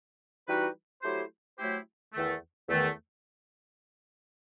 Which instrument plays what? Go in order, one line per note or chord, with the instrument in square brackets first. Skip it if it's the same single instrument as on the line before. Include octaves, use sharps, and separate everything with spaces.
[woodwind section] E3 G3 D#4 F#4 B4
F#3 A3 E4 G4 C5
F#3 A3 E4 G4 C5
E2 D#3 A3
E2 D#3 A3